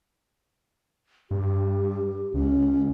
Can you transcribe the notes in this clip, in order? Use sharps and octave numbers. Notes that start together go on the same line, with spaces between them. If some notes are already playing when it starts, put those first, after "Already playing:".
G2 G4
C#2 C#4